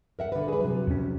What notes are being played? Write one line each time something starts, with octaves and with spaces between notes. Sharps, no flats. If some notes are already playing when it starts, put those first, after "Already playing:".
A#4 E5 F#5
D3 B4
G#4 B4
C3 F#3
F2 C#4